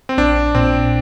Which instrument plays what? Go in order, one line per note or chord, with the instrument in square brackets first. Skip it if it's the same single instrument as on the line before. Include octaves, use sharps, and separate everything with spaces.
[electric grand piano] C4
[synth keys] A#1 [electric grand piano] D4
[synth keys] A#2 [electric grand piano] C4